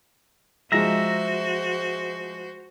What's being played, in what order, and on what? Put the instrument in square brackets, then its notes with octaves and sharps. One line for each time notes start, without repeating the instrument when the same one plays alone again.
[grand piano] F3 G#3 [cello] F#4 C5 [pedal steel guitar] E5 A#5